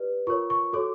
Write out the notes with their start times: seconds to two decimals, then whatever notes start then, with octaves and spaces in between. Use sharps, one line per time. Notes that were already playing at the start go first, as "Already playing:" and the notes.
Already playing: G4 B4 D5
0.27 F4 A#4 C#5 C#6
0.50 C#6
0.73 F#4 A4 C#5 D6